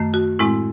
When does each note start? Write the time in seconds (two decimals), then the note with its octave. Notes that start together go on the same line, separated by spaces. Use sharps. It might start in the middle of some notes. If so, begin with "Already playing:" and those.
Already playing: F#2 D#3 A3
0.14 F#4
0.39 A2 G#3 C4 E4